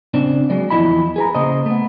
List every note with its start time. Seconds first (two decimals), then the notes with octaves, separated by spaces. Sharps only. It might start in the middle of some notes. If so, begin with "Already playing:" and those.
0.14 C#3 C4 D4
0.50 F#3 G#3 D5
0.70 E2 F3 A3 E4 D#5 B5
1.16 G#4 B4 A#5
1.35 C#3 A#3 C5 D#5
1.66 A3 B3